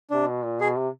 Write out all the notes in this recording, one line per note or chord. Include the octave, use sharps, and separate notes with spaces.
C3 D4
B2
A#2
B2 G#4
C3